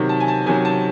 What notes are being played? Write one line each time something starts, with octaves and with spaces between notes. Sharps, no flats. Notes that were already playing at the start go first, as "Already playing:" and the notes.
Already playing: C3 D#3 F#3
A5
G#5
A5
C3 D#3 F#3 G#5
A5